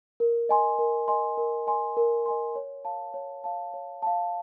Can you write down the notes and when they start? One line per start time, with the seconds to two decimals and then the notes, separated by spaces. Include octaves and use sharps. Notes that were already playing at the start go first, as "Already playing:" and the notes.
0.20 A#4
0.49 D#5 G#5 C6
0.79 A#4
1.08 D#5 G#5 C6
1.38 A#4
1.67 D#5 G#5 C6
1.97 A#4
2.26 D#5 G#5 C6
2.56 C#5
2.85 F5 A5
3.14 C#5
3.44 F5 A5
3.74 C#5
4.02 F5 A5